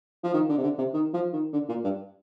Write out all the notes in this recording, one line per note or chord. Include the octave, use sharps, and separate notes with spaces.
F3
D#3
D3
C3
D3
C3
D#3
F3
D#3
D3
A#2
G2